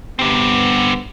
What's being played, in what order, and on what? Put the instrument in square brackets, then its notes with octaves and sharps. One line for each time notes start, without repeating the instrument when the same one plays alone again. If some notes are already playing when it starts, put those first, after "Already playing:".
[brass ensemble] G2 B3 [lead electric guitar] D3 C4